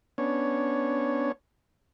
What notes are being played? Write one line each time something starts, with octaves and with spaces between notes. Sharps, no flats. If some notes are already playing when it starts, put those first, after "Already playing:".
B3 C#4 D4 C#5